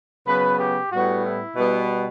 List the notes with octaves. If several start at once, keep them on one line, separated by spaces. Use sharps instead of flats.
C#3 F#3 B3 B4
G4
A2 G3 B3 F#4
E4
B2 G3 B3